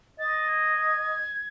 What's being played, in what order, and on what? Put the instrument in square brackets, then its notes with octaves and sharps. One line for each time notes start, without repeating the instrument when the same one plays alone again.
[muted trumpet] D#5 [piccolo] A6
[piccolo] G#6